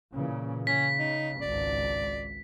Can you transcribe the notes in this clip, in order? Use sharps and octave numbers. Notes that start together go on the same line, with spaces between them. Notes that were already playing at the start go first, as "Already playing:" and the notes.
A#2 C#3 E3
C#3 C#4 B6
D#4
G#1 C#2 D5